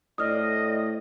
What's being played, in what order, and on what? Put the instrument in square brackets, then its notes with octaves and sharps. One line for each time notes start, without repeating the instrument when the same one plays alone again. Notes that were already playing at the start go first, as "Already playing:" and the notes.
[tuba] A2 [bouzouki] D4 C5 D5 [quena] D#5 [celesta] D#6 F6